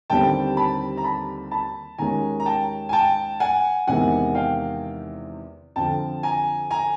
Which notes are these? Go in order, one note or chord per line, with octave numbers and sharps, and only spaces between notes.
D#2 D3 G3 C4 G5 A5
A5 B5
A#5
A5 B5
A5 B5
D#2 D#3 G#3 C#4 G#5 A#5
A#5
G5 A5
G#5
G5 A5
F#5 G#5
E2 C3 D#3 G#3 F#5 G#5
F5 G5
F2 D3 F3 G5 A5
G#5 A#5
G#5 A#5